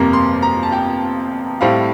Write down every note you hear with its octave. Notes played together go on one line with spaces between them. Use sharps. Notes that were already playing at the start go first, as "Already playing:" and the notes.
Already playing: G1 F2 C3 G3 A#3 A#5
C6
A#5
A5
G5
A2 G3 C4 E4 F5